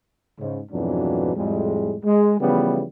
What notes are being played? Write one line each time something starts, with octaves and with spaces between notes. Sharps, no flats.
G#2 C#3
F2 G#2 B2 E3 F#3 D4
F2 A2 G3 G#3
G#3
C#3 E3 F3 G3 A3 B3